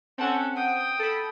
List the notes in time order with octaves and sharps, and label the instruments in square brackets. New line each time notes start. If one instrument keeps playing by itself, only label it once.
[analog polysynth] C4 F#5 [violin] C#4 A4
[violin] G5 D#6
[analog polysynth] A4 B5